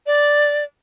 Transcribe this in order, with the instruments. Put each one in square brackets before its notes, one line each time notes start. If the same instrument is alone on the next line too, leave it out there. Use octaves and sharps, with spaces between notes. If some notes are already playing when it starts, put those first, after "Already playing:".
[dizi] D5